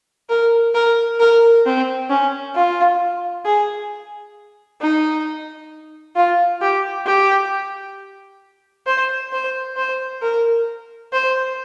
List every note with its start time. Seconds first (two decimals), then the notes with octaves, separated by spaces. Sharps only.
0.30 A#4
0.74 A#4
1.20 A#4
1.65 C4
2.10 C#4
2.55 F4
3.45 G#4
4.81 D#4
6.16 F4
6.61 G4
7.06 G4
8.86 C5
9.33 C5
9.77 C5
10.22 A#4
11.13 C5